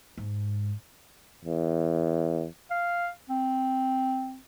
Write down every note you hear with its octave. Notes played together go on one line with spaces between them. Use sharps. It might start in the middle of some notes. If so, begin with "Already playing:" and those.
G#2
E2
F5
C4